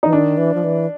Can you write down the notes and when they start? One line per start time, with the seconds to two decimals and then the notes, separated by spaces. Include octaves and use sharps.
0.03 E3 D#4
0.13 D#3 D4
0.38 E3
0.54 F3
0.64 E3